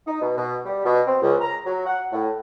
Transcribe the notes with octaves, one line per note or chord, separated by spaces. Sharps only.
D#4
B2
B2
G3
B2
C4
C#2
A#5
F#3
F#5
A2